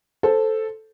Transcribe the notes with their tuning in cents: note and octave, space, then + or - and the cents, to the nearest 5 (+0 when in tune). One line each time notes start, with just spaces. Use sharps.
A4 +0 C5 +0